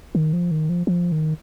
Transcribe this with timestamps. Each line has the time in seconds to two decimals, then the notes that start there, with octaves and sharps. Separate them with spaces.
0.15 D#3
0.33 F3
0.51 D#3
0.69 F3
0.87 F3
1.12 D#3